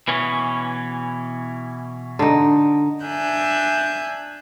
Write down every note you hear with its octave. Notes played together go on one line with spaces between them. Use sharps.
B2 E3 C#4
D3 D#4
D4 E5 G#5 F#6 G6